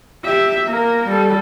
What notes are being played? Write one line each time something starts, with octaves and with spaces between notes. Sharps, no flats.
G4 E5
A#3 A#4
G3 A4